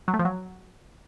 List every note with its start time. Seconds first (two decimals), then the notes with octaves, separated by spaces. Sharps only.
0.08 F#3
0.14 A3
0.19 F3
0.25 F#3